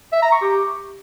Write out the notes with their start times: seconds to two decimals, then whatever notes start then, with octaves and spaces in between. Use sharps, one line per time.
0.13 E5
0.22 A#5
0.32 C#6
0.42 G4